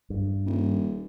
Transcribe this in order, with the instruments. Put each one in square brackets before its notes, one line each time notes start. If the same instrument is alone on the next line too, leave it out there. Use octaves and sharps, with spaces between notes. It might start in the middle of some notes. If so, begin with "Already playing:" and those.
[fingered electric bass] G2
[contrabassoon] D#1